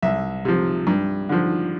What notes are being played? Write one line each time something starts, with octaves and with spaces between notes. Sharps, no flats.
C2 E5
C3 F3
G2
D3 F3